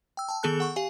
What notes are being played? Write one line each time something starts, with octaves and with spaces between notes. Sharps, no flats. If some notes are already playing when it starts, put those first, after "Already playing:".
G5 E6
G5 A5
D#3 B3 G#4 A4 A5 F#6
F#5 C#6
G4 F5 G#5